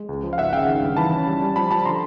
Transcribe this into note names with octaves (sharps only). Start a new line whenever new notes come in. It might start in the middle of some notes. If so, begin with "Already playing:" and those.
Already playing: G#3
C#2
F3
F5
G#1 E5 F#5
C#3 F5 G5
D#3
G2
E3 A5 B5
C#4
G3
G3
F3 A5 B5
F3 A5 B5
D3 A#5 C6